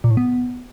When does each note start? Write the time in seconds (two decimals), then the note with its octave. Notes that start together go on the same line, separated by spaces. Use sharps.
0.04 A#2
0.11 A2
0.17 B3